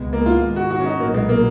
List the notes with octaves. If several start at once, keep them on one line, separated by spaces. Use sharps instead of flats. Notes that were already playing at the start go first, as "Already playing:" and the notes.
Already playing: C#2 B2 G#3 B3
A#3
F4
G#2 D#3 G#3
F#4
F#4
C#4
D#4
B1 A#2 F#3 A#3 B3
G#3
A#3